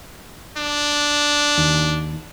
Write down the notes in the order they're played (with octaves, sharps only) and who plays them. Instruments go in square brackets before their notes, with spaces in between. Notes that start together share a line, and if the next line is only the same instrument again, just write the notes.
[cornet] D4
[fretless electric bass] D#2